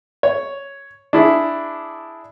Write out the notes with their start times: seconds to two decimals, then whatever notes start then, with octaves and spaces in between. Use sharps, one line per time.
0.23 C#5
1.13 D4 E4 G#4